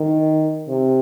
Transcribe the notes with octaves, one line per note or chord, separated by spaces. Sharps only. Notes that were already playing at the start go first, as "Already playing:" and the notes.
Already playing: D#3
C3